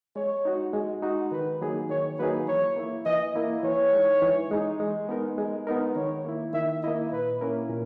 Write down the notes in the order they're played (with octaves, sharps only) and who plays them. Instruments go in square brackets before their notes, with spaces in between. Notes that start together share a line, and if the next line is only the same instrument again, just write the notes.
[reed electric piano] G#3 [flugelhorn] C#5
[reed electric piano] D#4 F#4
G#3
D#4 F#4
[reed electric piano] D#3 [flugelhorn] B4
[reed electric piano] F#3 A#3 D#4 G#4
[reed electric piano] D#3 [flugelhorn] C#5
[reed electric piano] F#3 A#3 D#4 G#4 [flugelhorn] B4
[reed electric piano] E3 [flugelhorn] C#5
[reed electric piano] A#3 E4
[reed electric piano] E3 [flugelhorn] D#5
[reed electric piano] A#3 E4
[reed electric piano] E3 [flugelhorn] C#5
[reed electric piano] G#3 D#4
E3
G#3 D#4
G#3
B3 D#4 A#4
G#3
B3 D#4 A#4
[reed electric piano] D#3 [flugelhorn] C#5
[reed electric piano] A#3 E4
[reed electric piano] D#3 [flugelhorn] E5
[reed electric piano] A#3 E4 [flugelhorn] D#5
[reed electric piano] A#2 [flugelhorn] B4
[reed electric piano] A#3 C#4 E4 A#4
A#2